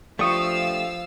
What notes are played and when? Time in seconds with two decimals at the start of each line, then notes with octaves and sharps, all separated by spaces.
0.19 F3 A3 D4 G4 F5 C#6 D#6 E6